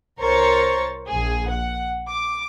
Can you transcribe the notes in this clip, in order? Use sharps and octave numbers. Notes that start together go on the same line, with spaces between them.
C2 A#4 C5 C#5 C#6 A6
A#1 G#4
F#5
D6